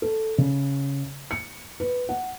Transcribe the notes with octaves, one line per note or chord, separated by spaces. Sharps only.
A4
C#3
C#7
B4
F#5